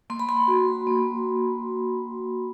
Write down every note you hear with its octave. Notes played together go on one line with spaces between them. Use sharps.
A#3 C6
B5
C6
F#4
A#3